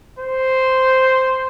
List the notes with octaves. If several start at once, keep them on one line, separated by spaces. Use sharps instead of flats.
C5